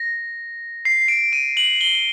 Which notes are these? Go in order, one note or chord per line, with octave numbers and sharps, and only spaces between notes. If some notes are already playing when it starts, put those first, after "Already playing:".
Already playing: A#6
C7
D7
D#7
F#7
G7